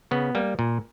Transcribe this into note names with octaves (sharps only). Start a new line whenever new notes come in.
C#3 B3
G3 A#3
A#2